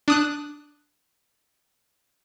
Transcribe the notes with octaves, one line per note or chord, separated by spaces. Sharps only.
D4 D#6 F#6